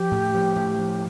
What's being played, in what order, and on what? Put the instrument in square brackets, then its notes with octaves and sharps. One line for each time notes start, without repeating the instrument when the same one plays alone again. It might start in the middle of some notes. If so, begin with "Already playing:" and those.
Already playing: [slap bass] F3 [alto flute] G4
[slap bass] A2
F3
A2
F3